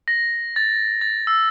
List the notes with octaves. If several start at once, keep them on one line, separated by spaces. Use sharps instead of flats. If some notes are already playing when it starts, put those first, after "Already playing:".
A#6
A6
A6
E6